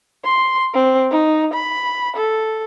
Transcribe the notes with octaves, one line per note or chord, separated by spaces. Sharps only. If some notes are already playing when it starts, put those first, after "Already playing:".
C6
C4
D#4
B5
A4